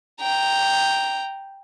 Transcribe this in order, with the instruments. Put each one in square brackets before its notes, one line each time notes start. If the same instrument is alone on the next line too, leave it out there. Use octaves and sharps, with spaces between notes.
[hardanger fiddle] G5 A#5